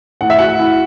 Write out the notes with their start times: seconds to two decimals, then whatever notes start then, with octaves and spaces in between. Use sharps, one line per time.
0.21 A2 F#5
0.30 E5
0.39 F#4 F#5
0.59 E4